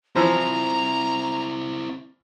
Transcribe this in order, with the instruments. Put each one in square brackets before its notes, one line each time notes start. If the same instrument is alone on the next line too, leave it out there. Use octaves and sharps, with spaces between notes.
[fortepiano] E3 F3 [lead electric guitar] C4 E4 [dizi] A#5